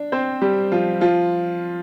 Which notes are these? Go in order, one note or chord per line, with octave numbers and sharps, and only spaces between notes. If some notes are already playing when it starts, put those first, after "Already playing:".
Already playing: D4
C4 C5
G3 G4
F3 F4
F3 F4